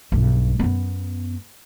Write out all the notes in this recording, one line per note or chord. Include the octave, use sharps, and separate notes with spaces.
B1 G2
F#2 B3